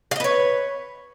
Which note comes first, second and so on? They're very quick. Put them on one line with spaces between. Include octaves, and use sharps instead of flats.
F5 D#5 B4 C#5